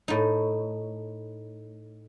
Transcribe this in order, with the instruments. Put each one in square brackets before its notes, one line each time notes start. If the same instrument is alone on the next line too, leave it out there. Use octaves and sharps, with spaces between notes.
[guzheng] A2 D#4